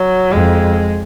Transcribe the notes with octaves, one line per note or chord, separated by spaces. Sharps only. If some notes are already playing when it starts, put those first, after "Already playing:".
Already playing: F#3
F2 G#3